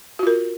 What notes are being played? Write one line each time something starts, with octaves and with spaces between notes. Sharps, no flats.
F4 F#4 A#4